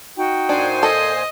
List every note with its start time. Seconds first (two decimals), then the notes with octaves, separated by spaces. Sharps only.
0.17 D#4 F#4 G5
0.49 A#2 D4 C5 G#5
0.83 A4 D#5